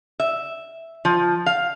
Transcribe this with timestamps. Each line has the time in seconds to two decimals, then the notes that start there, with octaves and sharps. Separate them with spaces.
0.20 E5
1.05 F3
1.46 F5